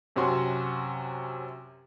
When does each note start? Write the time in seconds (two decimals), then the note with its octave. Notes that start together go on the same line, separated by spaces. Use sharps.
0.16 F#2 C3 C#4 F#4 C6